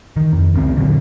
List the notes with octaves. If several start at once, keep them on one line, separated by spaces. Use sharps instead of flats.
D#3
F2
G1 C#2 C#3 C4
E2 A#2 D3 F#3